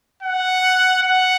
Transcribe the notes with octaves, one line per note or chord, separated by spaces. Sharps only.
F#5
F#5